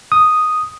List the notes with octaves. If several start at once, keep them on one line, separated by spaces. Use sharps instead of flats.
D#6